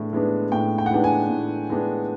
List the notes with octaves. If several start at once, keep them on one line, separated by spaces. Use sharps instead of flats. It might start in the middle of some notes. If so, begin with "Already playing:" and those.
Already playing: A2 E3 G#3 B3 D4
E3 G#3 B3 D4
A2 G5
G5
F#5
E3 G#3 B3 D4 G5
G#5
A2
E3 G#3 B3 D4